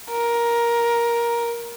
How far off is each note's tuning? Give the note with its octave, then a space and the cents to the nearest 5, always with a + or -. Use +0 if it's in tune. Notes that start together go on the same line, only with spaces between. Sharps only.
A#4 +15